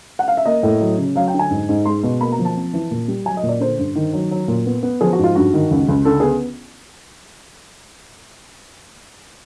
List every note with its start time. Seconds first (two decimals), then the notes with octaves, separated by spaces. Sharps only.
0.19 F#5
0.28 F5
0.37 E5
0.46 A#3 D#5
0.63 A2
0.81 F#3
0.98 C#3
1.15 F#3 F5
1.28 G5
1.34 D3
1.39 G#5
1.50 G#2
1.69 G#2
1.85 G#3 C6
2.03 B2
2.21 A#3 B5
2.32 A#5
2.39 F3
2.45 A5
2.57 C4
2.73 E3
2.91 A#2
3.08 G3
3.25 F#3 G#5
3.37 D#5
3.43 A#2
3.49 D5
3.60 D3 C5
3.78 G2
3.95 D#3
4.13 F#3
4.31 F#3
4.48 A#2
4.66 B3
4.83 B3
5.01 F3 G#4
5.13 F#4
5.19 G#2
5.24 F4
5.35 G2 F#4
5.54 D#3
5.71 C#2
5.89 C#2
6.05 D3 A4
6.20 B3 G#4